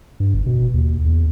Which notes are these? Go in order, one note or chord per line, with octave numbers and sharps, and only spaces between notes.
G2
G1
B2
D#2
E2